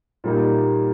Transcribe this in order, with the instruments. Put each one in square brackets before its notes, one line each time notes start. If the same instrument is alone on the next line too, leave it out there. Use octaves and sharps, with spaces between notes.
[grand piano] A#2 G3 A#3 D#4